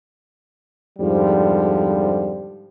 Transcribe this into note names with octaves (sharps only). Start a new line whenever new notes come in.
F2 G#2 D3 F3 G3